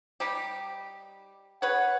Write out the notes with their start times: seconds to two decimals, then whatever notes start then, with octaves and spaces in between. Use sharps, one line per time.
0.20 G3 D#4 G4
1.62 G#4 B4 C#5 F#5